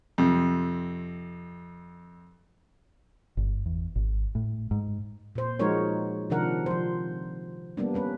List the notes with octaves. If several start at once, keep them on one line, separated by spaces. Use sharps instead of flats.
F2 C3
G1
E2
G#1
A2
G#2
A#2 C5
F3 G#3 D#4 F#4 A#4 C#5
C3 D#3 F3 D4 A#4 F#5
F3 C5
G3 A#3 B3 D4
G3 C#4 B4